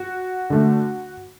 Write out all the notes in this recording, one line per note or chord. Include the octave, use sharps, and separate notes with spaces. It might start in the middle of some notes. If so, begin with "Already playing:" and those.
Already playing: F#4
D3 A3